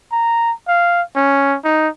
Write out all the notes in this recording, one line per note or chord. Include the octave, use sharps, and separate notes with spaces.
A#5
F5
C#4
D#4